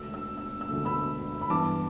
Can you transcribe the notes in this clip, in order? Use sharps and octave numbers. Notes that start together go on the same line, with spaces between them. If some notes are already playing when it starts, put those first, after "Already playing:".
Already playing: E1 D2 D3 A3 E6
E6
E6
E6
E1 D2 D3 A3
B5 E6
B5
G2 E3 B3 A5 D6